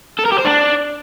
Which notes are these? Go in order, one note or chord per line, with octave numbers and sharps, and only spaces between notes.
A4
A#4
G4
C5
D4